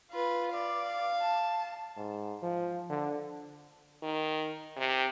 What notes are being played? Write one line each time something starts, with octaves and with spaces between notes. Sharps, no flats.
F4 B4
D5 F5
A5
G#2
F3
D3
D#3
C3